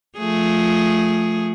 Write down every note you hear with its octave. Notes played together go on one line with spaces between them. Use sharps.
F3 A3 G#4